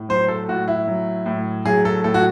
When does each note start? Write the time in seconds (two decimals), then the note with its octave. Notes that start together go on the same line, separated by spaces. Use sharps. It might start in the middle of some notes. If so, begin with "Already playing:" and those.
Already playing: A2
0.09 F#3 C5
0.28 A4
0.48 A2 F#4
0.68 E4
0.88 F#3
1.26 A2
1.65 F#3 G#4
1.85 A4
2.04 A2 A4
2.14 F#4